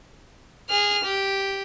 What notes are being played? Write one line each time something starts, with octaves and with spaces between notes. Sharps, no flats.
G#4 F6
G4